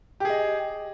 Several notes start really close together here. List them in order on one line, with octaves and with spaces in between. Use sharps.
G4 G#4 D#5